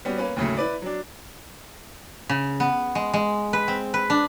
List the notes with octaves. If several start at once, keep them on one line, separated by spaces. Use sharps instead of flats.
G3 B3 C#4 F#4
A#3 C#4 B4
D#2 A2 C#3 F#3 A3
E4 B4 D5
F#3 D4
C#3
B3
G#3
G#3
B4
C4
B4
D4